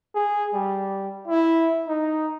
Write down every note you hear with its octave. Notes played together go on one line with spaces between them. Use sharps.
G#4
G3
E4
D#4